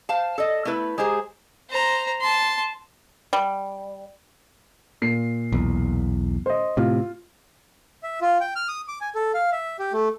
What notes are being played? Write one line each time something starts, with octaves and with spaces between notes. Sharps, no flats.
C5 F5 A5
A4 D5 D#5
A3 B3 E4 B4
G#3 G4 G#4 C5 A#5
C5 A#5
A5 C6
G3
A#2 C7
B1 E2
C5 D#5
A2 C3 F4
E5
F4
G5
F6
D#6
D6
G#5
A4
F5
E5
G4
A3